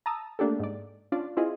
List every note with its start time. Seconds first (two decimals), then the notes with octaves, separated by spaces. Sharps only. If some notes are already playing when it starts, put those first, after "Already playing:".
0.06 A5 A#5 D#6 E6
0.39 A3 A#3 D4 G4 A4
0.59 G#2 D5
1.12 C#4 D4 F4 D5
1.37 C4 E4 F4 G#4 D#5